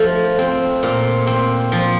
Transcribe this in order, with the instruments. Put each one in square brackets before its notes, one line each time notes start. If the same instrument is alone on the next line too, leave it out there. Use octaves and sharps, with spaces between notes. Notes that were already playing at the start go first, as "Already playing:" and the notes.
Already playing: [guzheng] F3 A3
C4
A#2
C4
F3